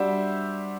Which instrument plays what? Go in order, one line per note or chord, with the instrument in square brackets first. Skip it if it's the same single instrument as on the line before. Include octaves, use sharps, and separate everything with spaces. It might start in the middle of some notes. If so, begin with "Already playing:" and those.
Already playing: [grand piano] G3 D4 F#4 C5 E5